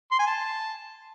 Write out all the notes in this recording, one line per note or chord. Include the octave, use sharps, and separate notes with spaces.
C6
G#5
A5